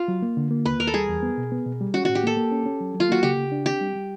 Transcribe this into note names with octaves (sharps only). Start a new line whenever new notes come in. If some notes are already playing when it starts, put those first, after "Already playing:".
Already playing: F4
F#3
A#3
D3
A#3
D#2 B4
D#2 A#4
A4
G3 G#4
E2
B3
B2
B3
B2
G3
C#4 F#4
A2 F#4
G4
A#3 A4
A#3
C#4
C#4
F#3
F#3
F4
A#3 F#4
C#3 G4
C#3
D4
C4 G4
G3
G3